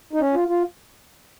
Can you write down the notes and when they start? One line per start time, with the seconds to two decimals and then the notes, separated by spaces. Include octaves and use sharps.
0.13 D#4
0.20 C#4
0.34 F4
0.48 F4